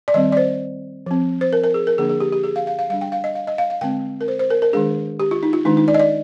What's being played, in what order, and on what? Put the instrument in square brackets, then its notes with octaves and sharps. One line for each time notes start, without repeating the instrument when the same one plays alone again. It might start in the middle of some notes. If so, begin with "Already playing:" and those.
[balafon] D5
D#3 G3 C4 D#5
D5
C5
F3 C4
C5
A#4
A#4
G#4
A#4
D3 F3 A#3 D4 G#4
G#4
G4
G4
G#4
F5
F5
F5
G3 D4 F5
G5
F5
D#5
F5
D#5
F5
F5
D3 G#3 C4 G5
A#4
C5
C5
A#4
A#4
D#3 G#3 D4 G#4
G4
F4
D#4
F4
D#3 G#3 D4 D#4
D#4
D5
D#5
D5